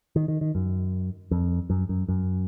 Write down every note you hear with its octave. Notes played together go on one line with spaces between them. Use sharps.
D#3
D#3
D#3
F#2
F2
F#2
F#2
F#2